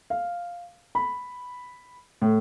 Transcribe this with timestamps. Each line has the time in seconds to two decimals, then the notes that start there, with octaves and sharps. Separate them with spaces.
0.10 F5
0.95 B5
2.22 A2